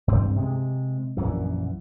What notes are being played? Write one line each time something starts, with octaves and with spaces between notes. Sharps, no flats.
G2 C4
C3 G#3
A#1 F#2 E3